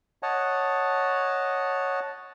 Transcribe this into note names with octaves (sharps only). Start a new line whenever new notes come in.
C#5 D#5 F#5 A5